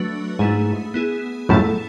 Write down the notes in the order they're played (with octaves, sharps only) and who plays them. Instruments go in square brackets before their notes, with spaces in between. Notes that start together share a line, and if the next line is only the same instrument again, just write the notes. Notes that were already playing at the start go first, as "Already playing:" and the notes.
Already playing: [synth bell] F#3 A3 D4 F#4 B4
[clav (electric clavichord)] G#2 [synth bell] A3 E4 G#4
[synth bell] B3 E4 G#4
[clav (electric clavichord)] F#2 A2 [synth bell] A3 E4 A4